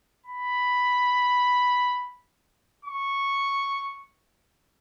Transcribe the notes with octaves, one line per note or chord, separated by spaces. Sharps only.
B5
C#6